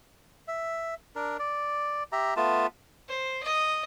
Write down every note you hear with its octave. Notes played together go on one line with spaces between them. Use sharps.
E5
D4 A#4
D5
G4 E5 A#5
A3 B3 F4 A5
C5
D#5